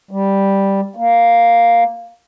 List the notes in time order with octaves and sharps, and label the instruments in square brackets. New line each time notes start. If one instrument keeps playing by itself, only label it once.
[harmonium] G3
A#3